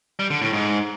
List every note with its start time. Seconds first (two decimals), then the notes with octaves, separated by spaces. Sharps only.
0.19 G3
0.30 D3
0.42 A2
0.53 G#2